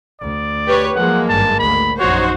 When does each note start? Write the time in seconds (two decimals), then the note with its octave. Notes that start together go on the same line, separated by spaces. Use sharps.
0.20 D2 D5
0.67 G4 B4 C#5
0.95 F3 F#3 G#3 A#3 F#5
1.29 G#1 G2 A5
1.59 D2 B5
1.99 A#1 F#2 D#4 F#4 C5 C#5